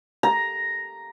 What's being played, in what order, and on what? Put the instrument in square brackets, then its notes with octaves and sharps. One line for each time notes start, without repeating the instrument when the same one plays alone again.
[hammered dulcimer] A#5